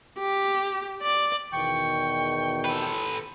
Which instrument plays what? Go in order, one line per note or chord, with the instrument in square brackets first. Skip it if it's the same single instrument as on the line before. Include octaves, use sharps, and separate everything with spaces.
[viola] G4
D5
[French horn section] E2 B2 D#3 [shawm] G5 [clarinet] C#6
[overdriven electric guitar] A4 B4